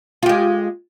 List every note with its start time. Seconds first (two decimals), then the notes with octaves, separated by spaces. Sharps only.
0.23 F4
0.26 G4
0.29 G#3